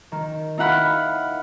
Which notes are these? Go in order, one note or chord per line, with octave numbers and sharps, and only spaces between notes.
D#3
D#4 E4 F5 F#5 B5 F6